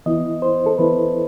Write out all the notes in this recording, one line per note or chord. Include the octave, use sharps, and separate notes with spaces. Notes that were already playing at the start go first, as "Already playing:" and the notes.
E3 B3 E4 D#5
C5
A4
E3 B3 E4 B4